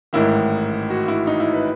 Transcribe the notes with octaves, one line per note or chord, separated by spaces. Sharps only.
A1 G#2 D#3 E4
F#4
E4
D#4
E4
B4